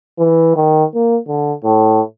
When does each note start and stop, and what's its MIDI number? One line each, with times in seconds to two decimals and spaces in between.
0.19 0.53 52
0.56 0.84 51
0.95 1.18 58
1.28 1.53 50
1.64 2.01 45